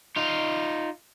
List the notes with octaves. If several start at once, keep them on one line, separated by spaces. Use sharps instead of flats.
D#4 F4